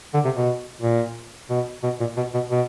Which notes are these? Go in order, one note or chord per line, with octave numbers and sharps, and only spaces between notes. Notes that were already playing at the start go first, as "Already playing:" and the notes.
D3
C3
B2
A#2
B2
B2
A#2
B2
B2
B2